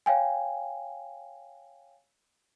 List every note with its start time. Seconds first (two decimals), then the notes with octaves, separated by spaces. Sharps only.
0.06 C#5 F5 G5 G#5